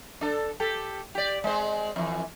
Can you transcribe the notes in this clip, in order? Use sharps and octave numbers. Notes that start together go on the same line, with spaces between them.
D4 A4
G4 A4
G4 D5
G#3 C4 C5
F2 E3